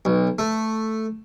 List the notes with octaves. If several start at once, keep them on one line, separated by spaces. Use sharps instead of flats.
B1
A3